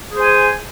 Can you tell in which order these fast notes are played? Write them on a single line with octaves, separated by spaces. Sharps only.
G#4 C5 G#5